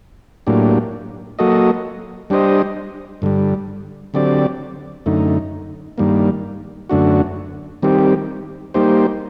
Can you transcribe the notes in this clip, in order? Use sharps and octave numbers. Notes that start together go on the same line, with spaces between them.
A2 F#3 A#3 D4 G4
F#3 A#3 F#4 A4 D#5
G3 D4 G4 C5 D#5
G2 D3 G3
D3 F#3 C4 G4 D5
F#2 D3 A3 D#4
G2 D#3 G3 A#3
F#2 D3 A3 D4 F#4
D#3 G3 C4 G4
G3 A#3 D#4 G4 C5